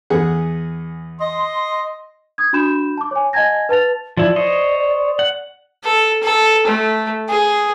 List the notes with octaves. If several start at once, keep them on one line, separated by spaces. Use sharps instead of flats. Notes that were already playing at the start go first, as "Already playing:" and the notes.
E2 G#4 F#5
D#5 C6
D#6 G#6
D4 F#4 B5 G6 E7
A5 D6
C#5 G#5
D#5 F#5 G#5 A5 G#6 A#6
B4 A5 A6 F7
F3 E4 D5
C5 C#5 D#5
F#5
A4
A4
A3
G#4